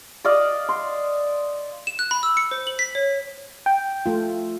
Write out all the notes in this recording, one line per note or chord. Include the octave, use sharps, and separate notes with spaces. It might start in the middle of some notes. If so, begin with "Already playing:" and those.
D5 D#5 F5 D6
C6
E7
F#6
B5
E6
C#7
C5
F#7
B6
C#5
G5
A3 F4